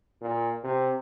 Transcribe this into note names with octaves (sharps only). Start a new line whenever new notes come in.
A#2
C3